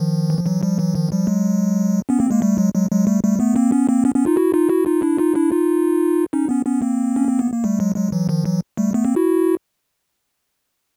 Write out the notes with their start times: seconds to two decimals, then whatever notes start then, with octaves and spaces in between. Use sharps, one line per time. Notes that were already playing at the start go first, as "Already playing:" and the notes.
Already playing: D#3 F3
0.30 E3
0.39 F3
0.46 E3 F#3
0.63 F3 G3
0.79 E3 F#3
0.95 D#3 F3
1.12 F3 G3
1.27 F#3 G#3
2.09 B3 C#4
2.20 A#3 C4
2.31 G#3 A#3
2.42 G3 A3
2.58 F#3 G#3
2.74 F#3 G#3
2.91 F#3 G#3
3.07 G3 A3
3.23 G3 A3
3.40 A3 B3
3.56 A#3 C4
3.72 B3 C#4
3.89 A#3 C4
4.05 B3 C#4
4.15 B3 C#4
4.26 D#4 F4
4.37 E4 F#4
4.54 D#4 F4
4.69 E4 F#4
4.86 D#4 F4
5.02 D4 E4
5.18 D#4 F4
5.35 D4 E4
5.52 D#4 F4
6.33 C#4 D#4
6.49 B3 C#4
6.66 B3 C#4
6.82 A#3 C4
7.16 C#4
7.29 C4
7.39 B3
7.52 A#3
7.64 G3 A3
7.80 F#3 G#3
7.96 F#3 G#3
8.12 E3 F#3
8.29 D#3 F3
8.45 E3 F#3
8.77 G3 A3
8.94 A3 B3
9.05 A#3 C4
9.16 E4 F#4